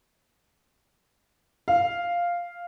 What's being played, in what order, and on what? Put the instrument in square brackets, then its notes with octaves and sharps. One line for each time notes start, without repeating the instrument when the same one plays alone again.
[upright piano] F5